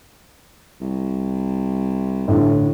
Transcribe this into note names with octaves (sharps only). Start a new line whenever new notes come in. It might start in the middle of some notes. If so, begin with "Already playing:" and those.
C2
A1 A2 D3